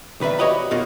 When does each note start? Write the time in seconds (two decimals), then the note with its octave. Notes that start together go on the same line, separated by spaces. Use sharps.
0.20 B1 D#3 B4 D5 E5
0.39 F#4 G4 C#5 D#5 F#5 B5
0.71 F2 B2 A#3 D#4 F4 F#4